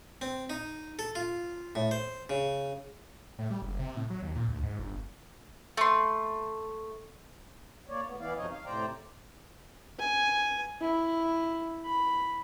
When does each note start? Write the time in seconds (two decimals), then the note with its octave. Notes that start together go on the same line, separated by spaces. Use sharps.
0.21 C4
0.50 D#4
0.99 A4
1.15 F4
1.75 A2
1.91 C5
2.30 C#3
3.39 A2
3.51 G3
3.62 F#1
3.79 C3
3.96 A2
4.10 F#3
4.23 D#2
4.36 A#2
4.48 D2
4.63 G#2
4.79 G1
5.77 A3 C6
7.89 A#3 C#5 D5
8.05 A2 B3
8.20 E3 B3 E4 D5 F5
8.37 F#2 C3 F3 D#4 C#5 D#5
8.51 F5
8.65 A2 C3 C5 D5 G5 A#5
9.99 G#5
10.81 E4
11.85 B5